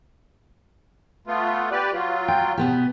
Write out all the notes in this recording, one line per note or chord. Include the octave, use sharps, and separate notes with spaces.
A3 B3 F4
G4 B4 D5
F#3 F4
G5
B2 B3 G4